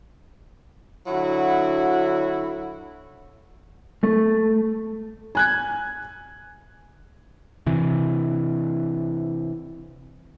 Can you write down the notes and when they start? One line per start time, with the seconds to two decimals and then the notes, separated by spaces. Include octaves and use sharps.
1.06 D3 F#3 E4 F#4
4.03 A3
5.35 G#5 F#6 G#6
7.67 C3 E3